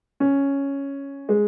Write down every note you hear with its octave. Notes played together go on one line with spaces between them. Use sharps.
C#4
G#3